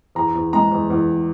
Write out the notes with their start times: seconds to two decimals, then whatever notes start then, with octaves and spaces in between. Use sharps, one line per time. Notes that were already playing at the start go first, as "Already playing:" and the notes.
0.15 E2 A#5
0.35 E2
0.53 G#3 A#5
0.71 E2
0.90 E2